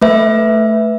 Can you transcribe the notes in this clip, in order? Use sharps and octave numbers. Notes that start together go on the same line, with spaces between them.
A3 B4 E5